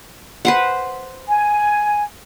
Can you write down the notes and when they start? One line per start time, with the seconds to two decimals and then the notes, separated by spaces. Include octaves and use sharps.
0.45 B4 C5 F#5
1.28 G#5